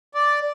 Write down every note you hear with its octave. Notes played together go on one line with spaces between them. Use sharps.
D5